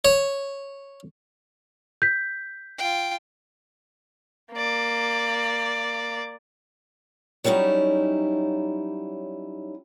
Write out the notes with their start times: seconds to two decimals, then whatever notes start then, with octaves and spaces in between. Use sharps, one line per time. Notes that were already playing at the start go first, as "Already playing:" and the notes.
0.05 C#5
2.02 G6 B6
2.78 F4 G5
4.53 A#3 D5
7.44 F#3 G3 C#4 D#4 E4